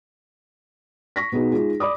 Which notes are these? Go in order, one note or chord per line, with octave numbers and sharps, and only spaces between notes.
C#6 A#6 B6
B2 B3 D#4 F#4 G#4
G#3 D#4 F4 G#4
D5 B5 D6 D#6